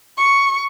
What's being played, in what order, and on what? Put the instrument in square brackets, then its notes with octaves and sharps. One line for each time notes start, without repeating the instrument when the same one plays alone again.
[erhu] C#6